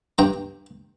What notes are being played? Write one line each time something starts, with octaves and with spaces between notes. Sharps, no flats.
G2 G5 A#5